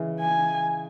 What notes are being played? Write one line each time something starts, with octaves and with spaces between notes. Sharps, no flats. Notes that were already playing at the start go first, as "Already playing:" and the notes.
Already playing: C#3 E3 G#3
G#5